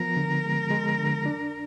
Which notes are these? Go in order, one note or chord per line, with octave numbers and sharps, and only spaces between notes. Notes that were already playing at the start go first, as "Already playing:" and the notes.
Already playing: F3 B3 A#4
D3
G#3
G#3
D3
D4